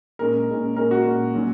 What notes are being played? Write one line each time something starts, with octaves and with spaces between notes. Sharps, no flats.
A#2 G#3 C#4 A#4
A#2 G#3 C#4
A#2 G#3 C#4 A#4
F#4
A#2 G#3 C#4
A#2 F#3 C#4